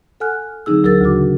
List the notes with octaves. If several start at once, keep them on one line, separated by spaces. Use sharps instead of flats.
A4 F#5 G#5 F6 F#6
D3 F#3 C4 D#4 G#4 E6
D2 F#3 G#4 A#4 E6 A6
D2 A#2 C#3 F#4 D6